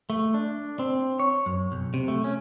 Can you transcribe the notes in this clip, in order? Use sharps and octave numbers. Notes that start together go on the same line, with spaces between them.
A3
D4
C4
C#5
F#2
B1
C3
A3
C#4